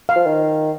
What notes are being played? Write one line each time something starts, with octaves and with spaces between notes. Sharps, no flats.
F5
F3
D#3